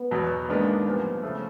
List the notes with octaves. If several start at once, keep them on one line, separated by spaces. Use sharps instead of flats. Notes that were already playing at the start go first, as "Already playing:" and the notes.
Already playing: B3
E2 B2 F#3
G#2 D#3 G#3 A#3 B3 D4
C2 A#2 F3 B3
C#3 F3 A3